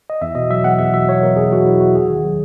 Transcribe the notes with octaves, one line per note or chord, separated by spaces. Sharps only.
D#5
E2 E5
B2 D#5
F#3 E5
E2 F#5
E2 E5
B2 E5
F#3 C#5
E2 A#4
E2 G#4
B2 F#4
F#3 E4
E2 F#4
D#2 G#4
D#3
F#3